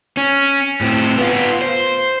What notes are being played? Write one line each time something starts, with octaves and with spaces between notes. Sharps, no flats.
C#4
A2 C4
B3 F4
C5